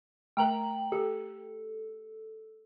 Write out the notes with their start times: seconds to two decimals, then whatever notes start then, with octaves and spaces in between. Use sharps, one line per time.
0.37 A3 A#4 G5 A#5 F#7
0.92 G4 A4